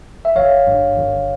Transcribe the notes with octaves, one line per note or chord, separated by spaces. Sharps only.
E5
G1 C#5 F5
G2
G1